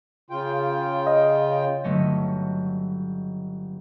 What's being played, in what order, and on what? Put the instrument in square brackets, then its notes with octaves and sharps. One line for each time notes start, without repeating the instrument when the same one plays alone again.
[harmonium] C#3 F4 G5
[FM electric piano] D#5
[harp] G1 F#3 A3 C#4 D#5